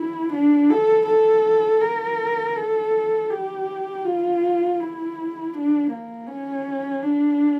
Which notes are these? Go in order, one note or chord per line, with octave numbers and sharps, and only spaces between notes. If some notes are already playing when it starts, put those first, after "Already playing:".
Already playing: E4
D4
A4
A4
A#4
A4
G4
F4
E4
D4
A#3
C#4
D4